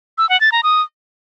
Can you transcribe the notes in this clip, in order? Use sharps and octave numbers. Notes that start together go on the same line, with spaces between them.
E6
F#5
A6
A#5
D#6